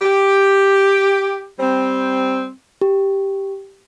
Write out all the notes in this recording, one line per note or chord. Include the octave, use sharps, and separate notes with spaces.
G4
G3 C4
G4